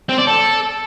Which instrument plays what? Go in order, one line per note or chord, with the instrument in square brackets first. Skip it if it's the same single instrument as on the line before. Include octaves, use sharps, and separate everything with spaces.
[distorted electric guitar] C4
D5
A4